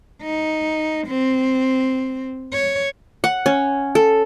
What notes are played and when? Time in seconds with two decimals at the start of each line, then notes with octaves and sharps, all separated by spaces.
0.23 D#4
1.07 C4
2.53 C#5
3.24 F#5
3.46 C#4
3.95 A4